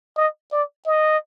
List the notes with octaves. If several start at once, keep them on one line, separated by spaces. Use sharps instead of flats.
D#5
D5
D#5